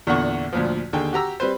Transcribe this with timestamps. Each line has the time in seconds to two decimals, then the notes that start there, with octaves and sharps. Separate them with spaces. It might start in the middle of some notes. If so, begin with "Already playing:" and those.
0.07 E2 A#2 D3 F#5 C#6
0.53 D2 A#2 F3
0.93 D#2 D3 G#4 G5
1.13 F#4 G4 A#5 E6
1.40 G3 C4 B4 C5